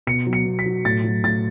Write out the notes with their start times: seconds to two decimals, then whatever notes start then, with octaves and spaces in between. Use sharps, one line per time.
0.07 B2 C#7
0.26 F#3
0.33 C#7
0.46 B2
0.59 B6
0.66 F#3
0.85 A2 A6
1.04 F#3
1.24 A2 A6